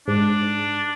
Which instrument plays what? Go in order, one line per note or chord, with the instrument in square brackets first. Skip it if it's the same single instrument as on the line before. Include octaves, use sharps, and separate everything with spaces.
[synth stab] G#2 [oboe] D4